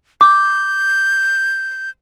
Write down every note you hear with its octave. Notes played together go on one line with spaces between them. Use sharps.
D6 G6